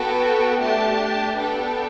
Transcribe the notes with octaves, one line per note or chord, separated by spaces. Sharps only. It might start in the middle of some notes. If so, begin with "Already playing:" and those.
Already playing: B3 F#4 A4 G5
A3 D4 G4 A5
B3 D4 A4 G5